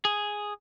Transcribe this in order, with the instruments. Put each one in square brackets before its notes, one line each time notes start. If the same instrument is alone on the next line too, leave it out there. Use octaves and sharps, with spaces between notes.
[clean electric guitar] G#4